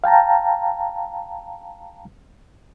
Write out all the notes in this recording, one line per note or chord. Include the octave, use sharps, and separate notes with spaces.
F5 G5 A5 A#5